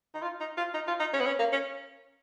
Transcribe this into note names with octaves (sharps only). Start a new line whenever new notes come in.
D#4
F4
D#4
F4
D#4
F4
D#4
C#4
B3
C#4
A#3
C#4